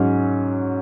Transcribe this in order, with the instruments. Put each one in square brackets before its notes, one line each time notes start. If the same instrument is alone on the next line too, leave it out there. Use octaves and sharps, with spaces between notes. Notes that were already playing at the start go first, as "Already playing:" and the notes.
Already playing: [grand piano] G#2 F#3 C#4